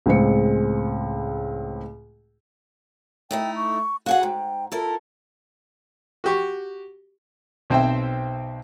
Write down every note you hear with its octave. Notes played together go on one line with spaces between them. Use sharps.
C#2 A2 G#3 C4 C#7
A3 D#4 E4 G5
C#6
F#4 G#4 F5 F#5
G#2 G5
E4 F4 A4 A#4
F#4 G4 C#6
B1 C4 C5 E5 G5